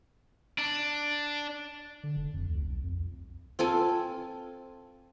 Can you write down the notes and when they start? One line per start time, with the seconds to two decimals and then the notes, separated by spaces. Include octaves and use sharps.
0.58 D4
2.03 D3
2.17 F1
2.33 F2
2.48 D2
2.64 B1
2.83 F2
3.59 C4 F4 A4 G#5